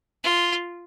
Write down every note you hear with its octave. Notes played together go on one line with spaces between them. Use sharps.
F4